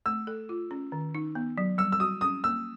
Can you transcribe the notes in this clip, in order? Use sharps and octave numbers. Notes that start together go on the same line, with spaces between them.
A3 E6
A4
F4
C#4
D#3
D#4
B3
F#3
G3 E6
E6
F#4 D#6
C#4 D#6
A#3 E6